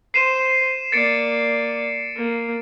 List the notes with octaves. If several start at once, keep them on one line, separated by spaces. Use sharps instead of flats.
C5 C7 D#7 E7
A#3 D5 A6 C#7 D7
A#3